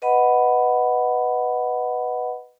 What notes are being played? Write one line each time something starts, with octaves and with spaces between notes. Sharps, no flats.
B4 D#5 F#5 B5